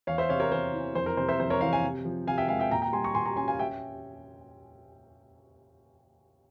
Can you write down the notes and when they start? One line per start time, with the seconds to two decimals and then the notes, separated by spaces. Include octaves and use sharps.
0.07 E2 C#5 F5
0.18 C5 E5
0.29 C3 C#5 F5
0.40 A#4 C#5
0.52 E2 C5
0.74 E3
0.95 F2 C5
1.06 A#4
1.17 C3 C5
1.28 C5 E5
1.40 F2 C5
1.50 A#4 C#5
1.61 E3 C#5 F5
1.73 F5 G#5
1.84 C3
2.05 F3
2.27 C3 F5 G#5
2.38 E5 G5
2.48 G#3 F5 G#5
2.59 E5 G5
2.71 A#2 G5 A#5
2.82 G5 A#5
2.93 G3 G#5 C6
3.04 A#5 C#6
3.15 A#2 G#5 C6
3.25 A#5 C#6
3.36 C#4 G#5 C6
3.48 F5 G#5
3.59 E5 G5